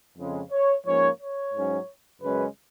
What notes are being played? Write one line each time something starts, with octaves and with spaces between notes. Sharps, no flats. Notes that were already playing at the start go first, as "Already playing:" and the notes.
F2 C#3 G#3
C#5
G#2 F3 A#3 C#4 C#5
C#5
G#2 F#3 C#4
F#2 C#3 G#3 C#4 B4